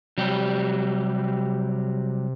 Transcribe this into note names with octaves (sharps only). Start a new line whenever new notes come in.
C3 F#3 G3 G4